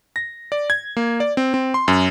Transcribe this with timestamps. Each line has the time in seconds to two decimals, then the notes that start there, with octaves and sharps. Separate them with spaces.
0.16 A#6
0.52 D5
0.70 G#6
0.97 A#3
1.20 D5
1.37 C4
1.54 C4
1.74 C6
1.88 F#2